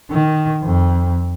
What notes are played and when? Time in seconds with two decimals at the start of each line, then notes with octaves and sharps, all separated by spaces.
0.10 D#3
0.63 F2